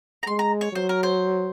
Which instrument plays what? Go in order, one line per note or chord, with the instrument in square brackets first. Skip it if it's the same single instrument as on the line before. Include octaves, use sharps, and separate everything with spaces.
[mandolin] A#5
[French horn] G#3 [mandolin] C6
[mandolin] A#5
C#5
[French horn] F#3 [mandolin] C5
[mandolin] A#4
C5